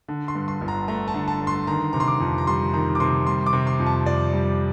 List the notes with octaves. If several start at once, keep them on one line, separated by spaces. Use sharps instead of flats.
D3
C6
G2
C6
G1
A#5
A3 A#5
A5
D3
A5
G2
C6
D#3 A#5
C3 A#5
C6
D6
F2
A#5
G3 C6
D#3 A#5
D6
C3 C6
G3 C6
D6
C3
C6
F2
A5
F2 D5
G3